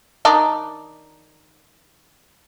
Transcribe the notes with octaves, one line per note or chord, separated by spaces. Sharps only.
D#3 D4 D#4